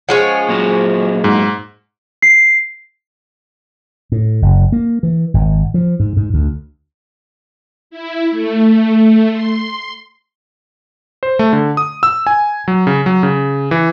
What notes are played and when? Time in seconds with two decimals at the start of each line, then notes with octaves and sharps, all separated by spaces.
0.09 F3 G#3 C#4 F#5
0.49 A#2 F#3
1.24 G#2
2.22 C7
4.12 A2
4.42 F#1
4.72 A#3
5.03 E3
5.34 G#1
5.74 F3
6.00 G#2
6.17 G#2
6.34 D2
7.91 E4
8.31 A3
9.31 C6
11.23 C5
11.39 A3
11.53 D3
11.77 D#6
12.03 E6
12.27 G#5
12.68 F#3
12.87 C#3
13.06 F#3
13.23 C#3
13.71 E3